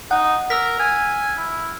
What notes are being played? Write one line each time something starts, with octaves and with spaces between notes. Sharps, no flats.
D#4 F#5
A#4 E6 F6 B6
G#5
E4